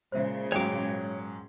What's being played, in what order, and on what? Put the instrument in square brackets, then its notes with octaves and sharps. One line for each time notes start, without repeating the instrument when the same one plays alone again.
[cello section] A#2 C#3 G#3 [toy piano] C5 E5
[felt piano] G#2 F#3 [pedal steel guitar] C#5 D6 [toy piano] G5